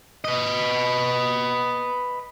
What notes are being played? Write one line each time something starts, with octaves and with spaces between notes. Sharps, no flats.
B4 D#5